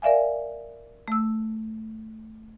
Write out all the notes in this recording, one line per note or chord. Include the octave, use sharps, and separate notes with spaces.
A#4 D5 E5 F5 G#5
A3 E6